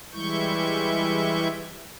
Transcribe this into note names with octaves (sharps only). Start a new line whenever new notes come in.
E3 G3 G#3 E4 C#6 G6